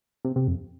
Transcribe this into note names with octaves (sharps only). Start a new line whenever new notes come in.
C3
C3
F2